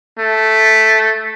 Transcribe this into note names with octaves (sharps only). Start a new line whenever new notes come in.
A3